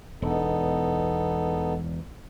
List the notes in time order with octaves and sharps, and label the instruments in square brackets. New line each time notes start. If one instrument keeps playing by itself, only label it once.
[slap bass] E1 [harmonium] B3 D#4 A4